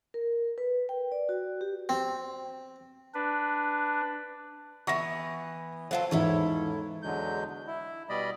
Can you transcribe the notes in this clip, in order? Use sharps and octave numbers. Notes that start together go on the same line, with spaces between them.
A#4
B4
G5
D5
F#4
G4
C4
D4 B4
E3 B3 C#6 A#6
F#3 F4 A4 C5
A1 E2 G#2 E4 A4 C#5
E2 D3 F#3 G#3 G6
E4
B2 G3 D5 D#5 B5